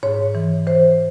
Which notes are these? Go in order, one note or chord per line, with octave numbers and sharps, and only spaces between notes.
G#2 C#5
E3
E3 C5